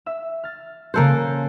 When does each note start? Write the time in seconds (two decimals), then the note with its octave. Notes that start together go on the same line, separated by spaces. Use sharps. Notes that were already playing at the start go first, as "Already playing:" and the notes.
0.06 E5 E6
0.44 F6 A6
0.94 C#3 A#3 A4 C5 F#6